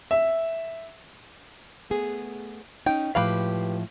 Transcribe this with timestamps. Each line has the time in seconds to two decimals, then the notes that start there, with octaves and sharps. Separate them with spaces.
0.11 E5
1.90 A3 B3 G#4
2.86 C#4 D#4 G5
3.15 A2 F3 G#3 G4 B4 F5